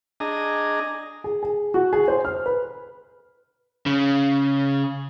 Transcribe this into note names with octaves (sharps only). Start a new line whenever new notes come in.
D4 G#4 D#5 A#5
G#4
G#4
F#4
G#4
C5
F6
B4
C#3